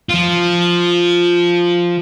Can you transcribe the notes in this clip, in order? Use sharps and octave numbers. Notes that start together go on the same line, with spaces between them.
F3 F4